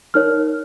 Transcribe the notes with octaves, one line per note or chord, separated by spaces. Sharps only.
D#4 A#4 C#5 F6